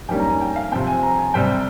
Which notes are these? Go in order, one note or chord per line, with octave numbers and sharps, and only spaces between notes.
F2 D#3 G3 A#3 C#4 G5
A#5
G#5
G5
F5
C3 F3 C4 G5
G#5
A#5
G#5
C3 G3 C4 G5